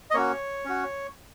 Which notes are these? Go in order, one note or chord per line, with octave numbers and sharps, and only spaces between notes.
D#5
A#3 C#4 F#4 C#5
C#4 F#4